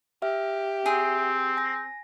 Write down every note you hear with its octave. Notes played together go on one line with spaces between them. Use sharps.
G4 E5 F6
C4 G#4
G#5 A#6